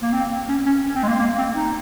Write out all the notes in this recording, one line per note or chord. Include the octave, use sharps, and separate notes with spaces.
A#3
C4
C#4
C#4
C4
G#3
A#3
A#3
C4
D#4